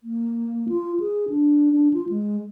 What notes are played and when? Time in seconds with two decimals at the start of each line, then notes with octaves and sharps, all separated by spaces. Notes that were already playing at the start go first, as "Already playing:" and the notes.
0.04 A#3
0.69 F4
1.00 G#4
1.29 D4
1.72 D4
1.94 F4
2.09 G#3